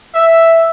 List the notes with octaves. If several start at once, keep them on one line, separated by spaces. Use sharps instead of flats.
E5